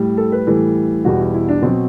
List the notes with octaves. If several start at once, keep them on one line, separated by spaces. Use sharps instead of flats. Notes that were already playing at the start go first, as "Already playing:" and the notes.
Already playing: A2 G3
A4
B4
A2 E3 G3 A4
E2 B2 G3 F#4
E4
E4
D4
B2 F#3 C4